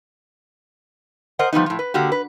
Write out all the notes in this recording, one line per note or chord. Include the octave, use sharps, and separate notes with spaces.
A#4 C5 D#5 F#5
F3 G3 B3 D#4
A2 F3
B4
D3 A#3 F#4 G4
B4